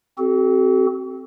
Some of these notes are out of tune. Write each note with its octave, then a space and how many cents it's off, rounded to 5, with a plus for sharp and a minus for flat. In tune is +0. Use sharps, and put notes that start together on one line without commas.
C4 +0 F#4 +40 A4 -25